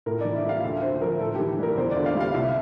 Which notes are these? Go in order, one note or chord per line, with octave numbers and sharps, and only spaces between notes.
A2 A#4
E3 D5
E5
G3 F5
D2 E5
D3 C5
F3 A#4
A2 A4
G4
E3
G3 A#4
E2 C5
D5
D3
F5
G3
F5
C2 E5